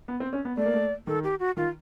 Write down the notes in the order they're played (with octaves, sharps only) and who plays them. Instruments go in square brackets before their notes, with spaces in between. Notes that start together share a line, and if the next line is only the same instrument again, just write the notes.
[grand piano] B3
C4
C#4
B3
[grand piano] A3 [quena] D5
[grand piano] A#3
A3
[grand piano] D#3 [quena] A4
[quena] G4
F#4
[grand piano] D#3 [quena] F4